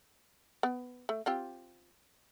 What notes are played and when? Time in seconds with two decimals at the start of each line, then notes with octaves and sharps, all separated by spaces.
0.63 B3
1.09 A3
1.26 C4 F4 G4